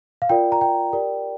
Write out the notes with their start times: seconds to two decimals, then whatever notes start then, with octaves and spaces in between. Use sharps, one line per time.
0.22 F5
0.29 F4 A#4 D5 G5
0.52 A#5
0.61 G5
0.93 G4 A#4 D5